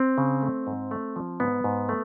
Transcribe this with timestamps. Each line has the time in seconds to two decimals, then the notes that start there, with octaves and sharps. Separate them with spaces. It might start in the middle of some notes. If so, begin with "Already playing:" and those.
Already playing: C4
0.18 C#3
0.42 A3
0.67 G#2
0.91 A3
1.16 F3
1.40 G#2 B3
1.64 G#2
1.89 A3